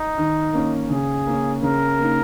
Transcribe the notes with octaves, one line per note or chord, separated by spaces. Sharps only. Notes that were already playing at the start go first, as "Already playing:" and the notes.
Already playing: D#4
D#3
A#3 C#4
C#3 G#4
A#3 C#4
C#3 A#4
A#3 D#4